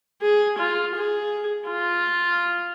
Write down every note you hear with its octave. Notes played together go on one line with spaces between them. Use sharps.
G#4
F4
G#4
F4